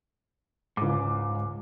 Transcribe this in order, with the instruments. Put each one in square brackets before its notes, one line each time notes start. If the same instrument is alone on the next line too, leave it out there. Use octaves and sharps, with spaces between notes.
[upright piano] C#2 D6 [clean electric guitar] G#2